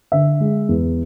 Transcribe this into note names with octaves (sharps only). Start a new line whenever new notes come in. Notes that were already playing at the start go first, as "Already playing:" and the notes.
D3 E5
G#3
E2